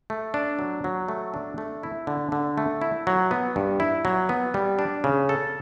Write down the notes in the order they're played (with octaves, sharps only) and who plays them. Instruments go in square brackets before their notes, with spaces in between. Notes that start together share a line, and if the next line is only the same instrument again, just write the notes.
[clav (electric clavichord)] A3
D4
F#3
F#3
A3
D4
A3
E4
D3
D3
A3
E4
F#3
B3
G2
E4
F#3
B3
G3
D4
C#3
A4